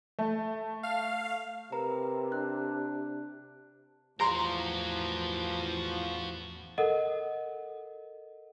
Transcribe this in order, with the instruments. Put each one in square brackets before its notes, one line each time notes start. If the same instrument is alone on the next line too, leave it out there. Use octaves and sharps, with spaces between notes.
[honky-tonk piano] A3
[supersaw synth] F5
[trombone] C3 [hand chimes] A#4 B4 A#5
[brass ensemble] D4 [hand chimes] F#6
[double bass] A1 E2 [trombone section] E3 F3 [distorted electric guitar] F#4 A#4 [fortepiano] A#5 C6
[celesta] A4 A#4 D#5 F#5